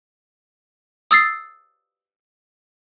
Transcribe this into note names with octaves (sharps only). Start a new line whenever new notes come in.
D#6 E6 A6 C7